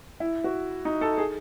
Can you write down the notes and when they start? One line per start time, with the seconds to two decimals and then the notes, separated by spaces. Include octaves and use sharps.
0.20 E4
0.44 F#4
0.85 D#4
1.01 A4
1.18 G#4